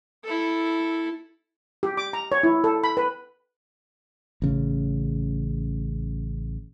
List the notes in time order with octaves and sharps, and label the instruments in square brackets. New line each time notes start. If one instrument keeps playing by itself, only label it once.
[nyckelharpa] E4 A4
[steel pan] G4
D6
A#5
C#5
E4
A4
B5
B4
[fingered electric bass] A1 C#3